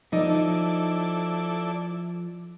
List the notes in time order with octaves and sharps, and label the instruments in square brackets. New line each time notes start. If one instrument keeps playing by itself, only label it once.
[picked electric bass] F3 [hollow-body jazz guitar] D#4 [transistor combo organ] E4 A4 D5